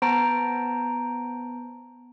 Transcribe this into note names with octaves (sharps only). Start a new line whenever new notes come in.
B3 C5 A5 A#5 D7